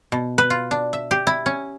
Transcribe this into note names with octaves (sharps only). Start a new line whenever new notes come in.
B2
B4
F4
D4
E5
G4
E4
C#4